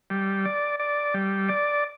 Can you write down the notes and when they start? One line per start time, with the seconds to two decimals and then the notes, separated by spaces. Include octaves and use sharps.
0.10 G3
0.45 D5
0.80 D5
1.14 G3
1.49 D5